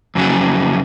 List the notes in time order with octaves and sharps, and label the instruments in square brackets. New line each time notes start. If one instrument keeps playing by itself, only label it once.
[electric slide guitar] F2 C#3 F#3